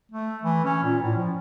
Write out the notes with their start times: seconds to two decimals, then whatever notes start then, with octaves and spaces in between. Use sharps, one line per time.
0.12 A3
0.43 E3
0.65 C#4
0.84 A#2
1.02 A2
1.17 F3